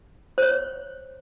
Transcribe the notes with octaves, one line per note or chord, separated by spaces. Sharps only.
C5 C#5